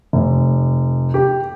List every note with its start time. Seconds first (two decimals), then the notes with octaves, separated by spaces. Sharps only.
0.13 F1
1.14 G4